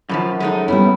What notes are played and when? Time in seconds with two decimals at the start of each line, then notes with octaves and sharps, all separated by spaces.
0.09 F#2 B2 D3 F3
0.40 G#3 A3 D#4
0.68 G3 B3 C#4 E4